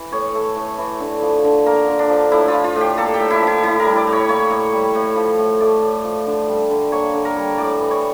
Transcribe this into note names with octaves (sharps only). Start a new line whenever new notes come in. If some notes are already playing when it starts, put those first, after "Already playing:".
Already playing: E3
A2 C#5
A3
A2
E3
D3
F3
D3
A#3 A#4
D3
D4
F3
A2 E4
F4
F3
F4
A2
G4
A#3 A4
G4
A2
E4
F3
E4
A2 E4
A#4
G3
D5
A2
C#5
A#3 C#5
A2
G3
A2
F3
A2
A3 D5
A2
F3
D3
G3
D3
A#3 C#5
D3
A#4
G3
A2 D5
E3
C#5